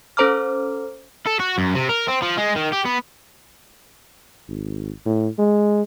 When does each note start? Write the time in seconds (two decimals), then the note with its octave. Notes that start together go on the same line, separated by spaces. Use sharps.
0.17 C#4 A4 C5 A#5 D6 F6
1.27 A4
1.40 F#4
1.58 F#2
1.75 C3
1.89 A#4
2.08 C4
2.22 F3
2.37 G#3
2.55 D#3
2.72 G4
2.85 B3
4.48 G#1
5.06 A2
5.39 G#3